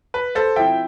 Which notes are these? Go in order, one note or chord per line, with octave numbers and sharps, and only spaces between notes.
B4
A4 C5
F3 C4 E4 E5 G5